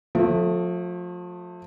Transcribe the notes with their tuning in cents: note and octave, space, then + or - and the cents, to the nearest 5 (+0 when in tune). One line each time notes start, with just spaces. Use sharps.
F3 +30 A3 +0